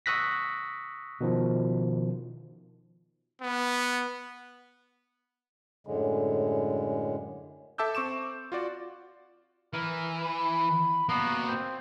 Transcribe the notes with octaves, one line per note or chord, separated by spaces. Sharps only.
C#6 D#6 E6 F#6 A#6 B6
B2 D#3 F3
B3
F#2 A2 D3 G#3
A4 E5 A5 D6 E6 G6
C4 C#6 D6 E7
F4 F#4 D5
E3 A#4
B5
A#3 B3 F#4
C4